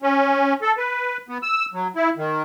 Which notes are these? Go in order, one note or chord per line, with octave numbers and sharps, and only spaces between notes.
C#4
A4
B4
B3
E6
F#3
E4
D#3